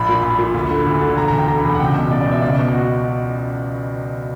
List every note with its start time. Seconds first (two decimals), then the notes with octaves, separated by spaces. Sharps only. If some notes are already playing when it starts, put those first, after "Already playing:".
Already playing: A#1 B5
0.08 A#2
0.23 A#1 B5
0.38 A#2
0.54 D2
0.70 D3
0.86 D2
1.01 D3
1.16 E1 A#5
1.28 A#5
1.32 D2
1.38 G5
1.48 D3 A#5
1.59 B5
1.64 E1
1.75 F#5
1.80 C#2 G5
1.95 B2
2.10 C#2 D5
2.21 D5
2.26 B2 E5
2.42 C#2 D5
2.58 B2
2.73 F#4